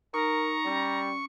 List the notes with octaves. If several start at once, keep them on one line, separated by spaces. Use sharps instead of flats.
D#4 A#4 A#5 C#6
G3 C#4